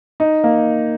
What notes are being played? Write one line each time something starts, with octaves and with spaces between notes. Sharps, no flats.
D#4
A#3